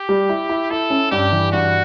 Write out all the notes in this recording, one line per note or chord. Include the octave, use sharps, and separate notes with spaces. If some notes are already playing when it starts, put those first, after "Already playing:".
Already playing: G4
G3
E4
E4
E4 A4
C#4
G2 G4
E3
G2 F#4